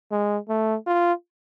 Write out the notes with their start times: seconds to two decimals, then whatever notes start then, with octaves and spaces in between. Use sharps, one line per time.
0.11 G#3
0.49 A3
0.86 F4